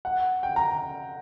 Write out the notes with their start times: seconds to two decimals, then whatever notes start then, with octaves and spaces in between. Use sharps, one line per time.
0.05 F#5
0.43 G5
0.56 A#5